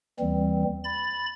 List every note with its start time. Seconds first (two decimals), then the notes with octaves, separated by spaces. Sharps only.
0.20 D#2 E3 G3 C4
0.84 B5 A6